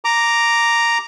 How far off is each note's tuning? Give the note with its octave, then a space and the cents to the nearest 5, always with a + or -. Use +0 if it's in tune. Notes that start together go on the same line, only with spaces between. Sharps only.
A#5 +0 D6 +0